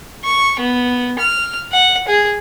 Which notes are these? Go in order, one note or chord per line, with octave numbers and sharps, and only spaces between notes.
C#6
B3
F6
F#5
G#4